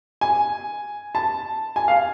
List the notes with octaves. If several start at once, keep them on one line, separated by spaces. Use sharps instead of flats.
G#5
A5
G#5
F5